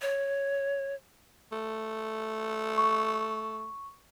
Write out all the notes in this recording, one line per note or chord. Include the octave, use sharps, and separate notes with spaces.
C#5
A3
C#6